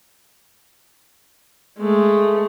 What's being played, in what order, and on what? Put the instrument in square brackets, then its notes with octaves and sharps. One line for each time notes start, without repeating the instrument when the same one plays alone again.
[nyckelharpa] G#3 A3